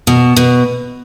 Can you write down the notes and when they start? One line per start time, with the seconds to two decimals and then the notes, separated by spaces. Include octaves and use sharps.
0.07 B2
0.36 B2